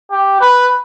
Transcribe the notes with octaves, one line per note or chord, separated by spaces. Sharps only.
G4
B4